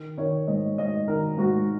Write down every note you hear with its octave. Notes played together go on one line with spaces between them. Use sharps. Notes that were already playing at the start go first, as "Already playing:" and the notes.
Already playing: D#3
D#3 C#5
G#2 D#5
G#2 D#5
D#3 A#4
G#2 F#4